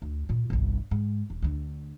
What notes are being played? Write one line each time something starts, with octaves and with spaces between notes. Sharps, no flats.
D2
A#2 F4
G1 C2
G#2
D#1
D2 D3